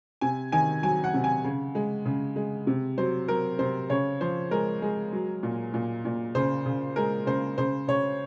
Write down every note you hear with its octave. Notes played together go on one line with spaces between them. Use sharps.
C3 G#5
D#3 G#5
F#3 G#5
F#5
C3
G#5
C#3
G#3
C#3
G#3
C3
F#3 C5
F#3 A#4
C3 C5
C#3 C#5
F3 C5
G#3 A#4
G#3
F#3
A#2
A#2
A#2
C#3 C5
C#3
G#3 A#4
C#3 C5
C#3 C5
C#3 C#5